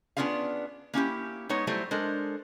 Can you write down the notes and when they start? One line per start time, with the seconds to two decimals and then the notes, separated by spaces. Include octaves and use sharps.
0.17 B3 C#4 D4 F4 G#4 F5
0.94 A#3 C#4 E4 G4
1.49 G#3 B3 D#4 C#5
1.67 F#3 G3 A3 E4 C5
1.91 G#3 D4 A4 A#4 C5